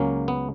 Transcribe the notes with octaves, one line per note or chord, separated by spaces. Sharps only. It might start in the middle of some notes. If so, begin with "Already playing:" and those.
Already playing: C#2 C#3 F#3 A#3 C#4
B3